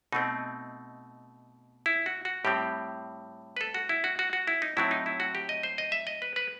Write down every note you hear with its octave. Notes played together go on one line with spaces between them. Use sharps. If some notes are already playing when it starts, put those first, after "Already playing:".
B2 A3 C4 D#4
E4
F#4
F#4
A2 G3 C4 G4
B4
A4
F#4
E4
F#4
F#4
F#4
E4
D#4
A2 F#3 C4 E4
D#4
E4
F#4
G4
D#5
C5
D#5
E5
D#5
B4
B4